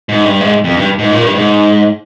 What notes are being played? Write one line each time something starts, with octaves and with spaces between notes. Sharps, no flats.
G#2
G2
G#2
F2
G2
G#2
A#2
G2
G#2